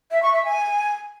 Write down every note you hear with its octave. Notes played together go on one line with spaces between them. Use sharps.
E5
C#6
E5
G#5